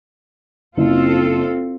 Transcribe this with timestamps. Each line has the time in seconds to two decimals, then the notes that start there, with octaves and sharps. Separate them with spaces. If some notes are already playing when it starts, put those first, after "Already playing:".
0.77 F#1 C4 F4 A4